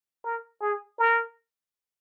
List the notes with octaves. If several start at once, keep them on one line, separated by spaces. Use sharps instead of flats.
A#4
G#4
A#4